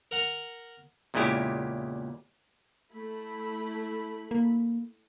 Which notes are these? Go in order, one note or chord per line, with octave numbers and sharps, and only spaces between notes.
A#4 F#5 A#5
E2 A#2 C#3 G#3 E4 G4
A3 E4 B5
A#3